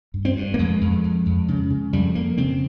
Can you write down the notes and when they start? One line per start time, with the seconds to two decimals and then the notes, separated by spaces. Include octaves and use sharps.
0.14 G2
0.25 C4
0.36 G2
0.54 A#3
0.59 F2 G#3
0.81 F2
1.04 F2
1.26 F2
1.48 C#3
1.70 C#3
1.93 F2 G3
2.15 F2 A#3
2.37 C#3 C4